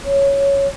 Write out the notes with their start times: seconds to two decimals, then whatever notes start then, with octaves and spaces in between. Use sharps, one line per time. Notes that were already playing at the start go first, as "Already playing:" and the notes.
0.05 C#5